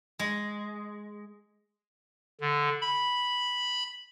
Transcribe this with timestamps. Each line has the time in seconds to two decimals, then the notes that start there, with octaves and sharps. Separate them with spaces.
0.19 G#3
2.41 D3
2.81 B5